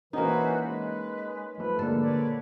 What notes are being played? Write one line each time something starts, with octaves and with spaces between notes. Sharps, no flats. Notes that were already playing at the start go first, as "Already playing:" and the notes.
E3 A#3 C#4 D#4 F#4 B4 C5 G#5
G#3 B4
F3 A3 B4
A#2 D3 G#3 A#3 A4
B4 C#5 D5